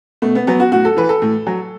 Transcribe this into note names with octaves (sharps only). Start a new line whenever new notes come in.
B2 A3
B3
F#3 B3
F#4
A2 F#4
A4
E3 B4
A4
A2
F#3